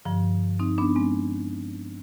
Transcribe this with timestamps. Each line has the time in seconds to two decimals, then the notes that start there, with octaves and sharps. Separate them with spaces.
0.05 G2 D3 F3
0.59 C4 D#4
0.78 B3 D4
0.96 G#3 C4